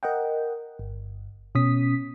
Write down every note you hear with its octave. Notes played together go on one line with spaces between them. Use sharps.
A#4 D#5 F#5 G5
G1
B2 C#4 D#6 B6